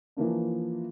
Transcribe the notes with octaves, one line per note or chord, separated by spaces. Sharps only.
E3 F3 A#3 D4